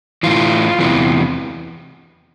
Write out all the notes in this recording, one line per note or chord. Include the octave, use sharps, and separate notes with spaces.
A2 E3 F4
E2 C3 E3